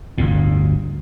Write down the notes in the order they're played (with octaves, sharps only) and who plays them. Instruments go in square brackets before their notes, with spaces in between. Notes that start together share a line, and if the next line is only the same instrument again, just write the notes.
[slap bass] G1 D2 A2